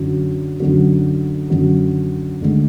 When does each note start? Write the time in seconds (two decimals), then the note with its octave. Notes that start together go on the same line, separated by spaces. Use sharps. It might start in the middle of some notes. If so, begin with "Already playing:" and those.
Already playing: F#2 D3 F#3
0.60 F#2 D3 F#3
1.50 F#2 D3 F#3
2.41 D2 D3 G#3